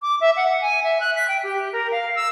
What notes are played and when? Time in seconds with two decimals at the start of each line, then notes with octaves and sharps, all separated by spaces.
0.02 D6
0.21 E5
0.37 F#5
0.61 G#5
0.83 E5
1.01 F#6
1.16 B6
1.28 G5
1.43 G4
1.72 A#4
1.92 F5
2.15 E6